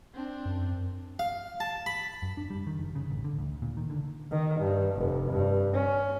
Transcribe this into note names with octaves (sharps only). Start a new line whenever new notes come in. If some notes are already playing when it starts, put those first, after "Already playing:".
C4 D4
F#2
F5
A5
B5
F#2
D4
G3
D#3
F#1
C#3
A1
D3
D2
A#2
D#3
D3
D#3
G2
F1
G2
C#4